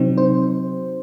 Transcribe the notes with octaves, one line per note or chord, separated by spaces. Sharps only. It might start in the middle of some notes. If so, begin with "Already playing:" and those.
Already playing: C3 F#3 C4 D#4
C5